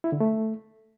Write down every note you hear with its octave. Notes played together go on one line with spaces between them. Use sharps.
E4
D3
A3